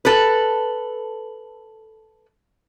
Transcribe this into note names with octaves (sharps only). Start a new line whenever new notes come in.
A4 B4